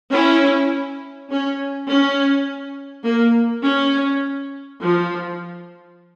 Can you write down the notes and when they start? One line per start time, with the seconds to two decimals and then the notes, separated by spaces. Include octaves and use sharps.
0.12 C#4 E4
1.30 C#4
1.87 C#4
3.05 A#3
3.64 C#4
4.81 F3